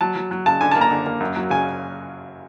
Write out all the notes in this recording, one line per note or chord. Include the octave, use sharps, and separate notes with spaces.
F#3 A5
F#3
F#3
C#3 A5
D3 G#5
A5
A#3
A#5
D3
A#3
F#2
F#3
C#3 G#5